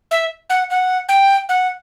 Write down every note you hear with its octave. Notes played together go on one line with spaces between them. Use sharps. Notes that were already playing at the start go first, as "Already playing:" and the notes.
E5
F#5
F#5
G5
F#5